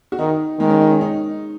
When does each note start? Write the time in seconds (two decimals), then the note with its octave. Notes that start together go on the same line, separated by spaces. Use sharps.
0.12 F#4
0.18 D#3 D#4
0.59 D#3 G#3
0.69 C#4
0.81 D#4
0.90 C#4
1.01 D#4